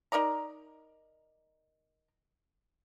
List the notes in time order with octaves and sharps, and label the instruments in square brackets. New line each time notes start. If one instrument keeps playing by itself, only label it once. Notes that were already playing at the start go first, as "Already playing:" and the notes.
[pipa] D#4 A#4 D5 A#5